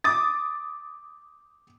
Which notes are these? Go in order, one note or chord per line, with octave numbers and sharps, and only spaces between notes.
D6 D#6 A6